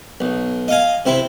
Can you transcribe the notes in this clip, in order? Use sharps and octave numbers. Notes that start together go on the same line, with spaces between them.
B1
D#5 F5 G#5
C3 C4 E4